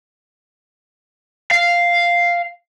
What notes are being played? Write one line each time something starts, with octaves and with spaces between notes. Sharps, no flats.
F5